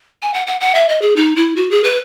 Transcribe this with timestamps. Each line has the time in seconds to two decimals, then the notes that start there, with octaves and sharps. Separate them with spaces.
0.22 G#5
0.34 F#5
0.47 F#5
0.61 F#5
0.75 E5
0.89 D#5
1.02 G#4
1.16 D#4
1.36 E4
1.56 F#4
1.71 G#4
1.84 B4